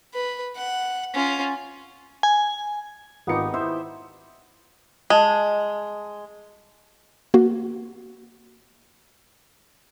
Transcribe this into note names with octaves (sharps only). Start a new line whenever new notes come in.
B4
F#5
C#4 F4
G#5
G#1 B3 D#4 F4 G4 C#7
E4 C5 E5
G#3 D#5 A5
A#3 F#4